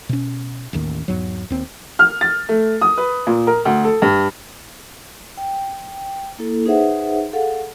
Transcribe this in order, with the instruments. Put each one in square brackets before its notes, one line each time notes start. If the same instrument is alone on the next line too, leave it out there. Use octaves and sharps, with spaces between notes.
[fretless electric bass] B2 C#4
A1 D#2 D#3
E2 G#2 F#3
D#2 C4
[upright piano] F6
A6
A3
D#6
B4
A#2
A#4
D2
A4
G2
[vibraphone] G5
A#3 E4 A4
D#4 G#4 B4 C5 E5 F#5
G#4 A4 F5 F#5